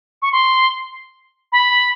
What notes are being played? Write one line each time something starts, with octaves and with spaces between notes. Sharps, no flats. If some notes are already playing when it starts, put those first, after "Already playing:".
C#6
C6
B5